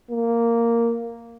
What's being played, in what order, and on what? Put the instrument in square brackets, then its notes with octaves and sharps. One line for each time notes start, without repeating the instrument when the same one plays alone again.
[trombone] A#3